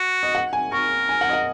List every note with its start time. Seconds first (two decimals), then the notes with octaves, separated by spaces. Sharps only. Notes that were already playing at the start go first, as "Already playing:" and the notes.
Already playing: F#4
0.23 D#5
0.35 F#5
0.53 G#5
0.72 A#4 C#6
1.09 G#5
1.21 F#5
1.29 D#5
1.33 F#5